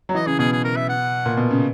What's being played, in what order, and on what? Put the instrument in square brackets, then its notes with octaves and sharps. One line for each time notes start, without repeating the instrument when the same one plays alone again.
[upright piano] F#3
[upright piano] E3 [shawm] D#5
[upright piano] C#3 [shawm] G#4
[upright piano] B2 [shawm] G#4
[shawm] G#4
A#4
E5
F#5
[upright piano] A#2
B2
C#3